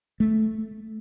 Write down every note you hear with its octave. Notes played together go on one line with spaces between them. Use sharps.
A3